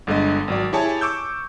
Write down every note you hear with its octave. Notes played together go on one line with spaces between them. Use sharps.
G1 D3 G#3 D#5
G#1 F#3 D5
E4 G4 G#4 C#5 G#5 A5
C#6 D6 E6 G6